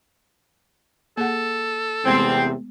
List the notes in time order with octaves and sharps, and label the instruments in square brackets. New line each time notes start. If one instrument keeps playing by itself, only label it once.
[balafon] A#3 G#4 F#5 [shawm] A4
[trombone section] E2 C3 [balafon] G#3 A3 B3 [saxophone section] C4